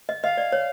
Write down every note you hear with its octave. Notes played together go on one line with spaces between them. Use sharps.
D#5
D#5 F5
D5
C#5